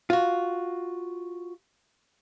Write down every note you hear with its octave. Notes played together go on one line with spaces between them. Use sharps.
F4 F#4